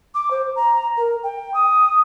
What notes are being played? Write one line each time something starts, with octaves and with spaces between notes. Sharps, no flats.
D6
C5
A#5
A#4
G5
D#6